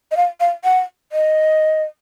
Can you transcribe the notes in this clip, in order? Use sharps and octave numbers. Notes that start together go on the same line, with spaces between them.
D#5
F5
F5
F#5
D#5